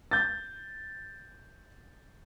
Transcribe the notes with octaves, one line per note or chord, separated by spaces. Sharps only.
G6 A6